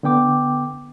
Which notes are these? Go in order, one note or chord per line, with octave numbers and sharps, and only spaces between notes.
D3 B3 G5 D6